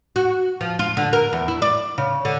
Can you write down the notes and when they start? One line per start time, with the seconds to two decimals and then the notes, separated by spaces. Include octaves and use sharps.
0.16 F#4
0.61 F3
0.79 F4
0.97 D3
1.13 A#4
1.33 E2
1.48 E4
1.62 D5
1.98 C#3
2.25 D3